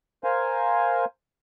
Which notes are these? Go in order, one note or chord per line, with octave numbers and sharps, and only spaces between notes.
A#4 C5 F5 G#5